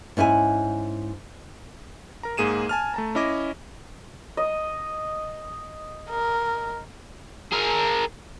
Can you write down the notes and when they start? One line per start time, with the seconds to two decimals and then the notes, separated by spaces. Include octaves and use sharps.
0.17 G#2 C#4 E4 G#4 G#5
2.23 A#4 A#5
2.37 G#2 A#3 G#4 D#7 E7
2.69 G#5 A5 F6
2.94 A3 A5 A#5
3.15 C#4 E4 D#5 D6 A#6
4.37 D#5
6.10 A#4
7.52 G#4 A#4